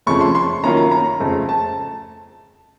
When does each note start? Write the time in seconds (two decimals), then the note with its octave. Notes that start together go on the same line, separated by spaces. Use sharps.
0.06 F2 C#3 F3 A3 C#4 C#6
0.21 C6
0.35 C6
0.63 D#3 F#3 A#3 C#4 F4 A#5
0.77 A#5
0.92 A#5
1.20 F2 C#3 A3 C4
1.49 A5